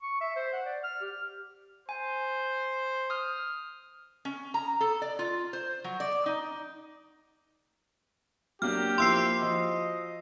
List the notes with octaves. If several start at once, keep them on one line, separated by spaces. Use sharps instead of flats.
C#6
E5
C5
F#5
D5
F6
G4
C5 G#5
D#6 F6
C#4
A#5
A4
D5
F4
C5
F#3
D5
D#4
F#3 A#3 D4 G4 F6
F3 A#3 E4 C6 E6 C7
F3 F4 F#4 D#5